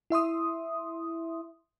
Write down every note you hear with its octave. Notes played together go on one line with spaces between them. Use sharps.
E4 E5 C6 D#6